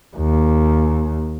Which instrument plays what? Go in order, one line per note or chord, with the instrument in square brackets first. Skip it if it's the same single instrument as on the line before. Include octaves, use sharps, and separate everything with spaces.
[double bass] D#2